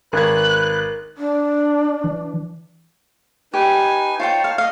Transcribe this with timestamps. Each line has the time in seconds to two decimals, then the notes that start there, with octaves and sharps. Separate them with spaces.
0.13 G#1 A#4 B4 F#6 G#6
1.17 D4
2.04 E3
3.54 D#4 G4 B4 G#5
4.20 D#4 F4 C5 C#5 G5 A5
4.44 F5
4.58 D#5 F5